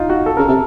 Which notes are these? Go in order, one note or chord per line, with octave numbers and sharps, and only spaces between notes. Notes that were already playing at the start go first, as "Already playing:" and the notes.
Already playing: D#4 F4
F#4
A4
C#3 A#4
C3 A4